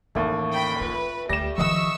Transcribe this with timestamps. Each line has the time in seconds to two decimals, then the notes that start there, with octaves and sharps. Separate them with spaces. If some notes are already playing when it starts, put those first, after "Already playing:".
0.15 A1 D#2 E3 A3 A5 C#6
0.52 G5 B5
0.81 F4 B4
1.29 D2 G3 G4 A#6 E7
1.58 D#3 F3 B4 D#5 F#5 C#6 E6